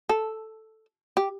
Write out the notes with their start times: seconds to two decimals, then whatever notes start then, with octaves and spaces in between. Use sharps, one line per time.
0.09 A4
1.17 G4